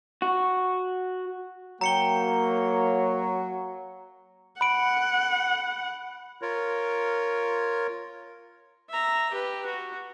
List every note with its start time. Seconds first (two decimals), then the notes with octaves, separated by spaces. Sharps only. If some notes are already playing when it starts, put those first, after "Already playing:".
0.22 F#4
1.81 F#3 A#3 G5 A#5 C#7 G7
2.23 F#4 C#5
4.61 F#5 B5 D7
6.42 F4 A#4 C#5
8.90 E5 A#5
9.32 G4 B4
9.66 F#4